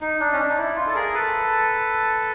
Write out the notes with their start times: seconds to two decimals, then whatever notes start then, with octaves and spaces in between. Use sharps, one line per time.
0.01 D#4
0.20 D4
0.33 C#4
0.39 D4
0.49 D#4
0.57 E4
0.76 F4
0.87 A4
0.95 G#4 A#4
1.14 A4 B4